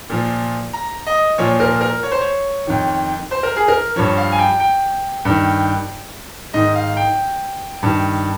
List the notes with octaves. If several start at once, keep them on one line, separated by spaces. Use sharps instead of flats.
A#2 F3
A#5
D#5
A#2 F3 C#5
A#4
A#4
C#5
C5
C#5
F2 D#3
C5
A#4
G#4
A#4
G2 F3 C#5
F5
G#5
G5
G5
G2 D#3
G#2 D#3 D#5
F5
G5
G2 D#3